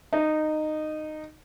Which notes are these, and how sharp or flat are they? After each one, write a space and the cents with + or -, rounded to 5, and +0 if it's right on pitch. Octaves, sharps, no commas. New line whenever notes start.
D#4 -15